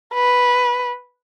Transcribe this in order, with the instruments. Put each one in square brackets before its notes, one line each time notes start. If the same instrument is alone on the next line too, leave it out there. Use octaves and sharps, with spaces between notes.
[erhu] B4